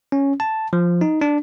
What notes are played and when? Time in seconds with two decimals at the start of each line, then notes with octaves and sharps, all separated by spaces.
0.12 C#4
0.40 A5
0.73 F3
1.01 D#4
1.21 D4